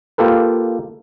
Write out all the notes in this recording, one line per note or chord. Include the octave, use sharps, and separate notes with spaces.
A#3 F4 G4 A4 B4